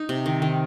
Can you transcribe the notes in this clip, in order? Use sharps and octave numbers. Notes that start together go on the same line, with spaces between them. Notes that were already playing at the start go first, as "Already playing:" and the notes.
Already playing: D#4
C3
D#3
D#3